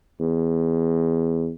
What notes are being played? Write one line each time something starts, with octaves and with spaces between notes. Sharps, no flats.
E2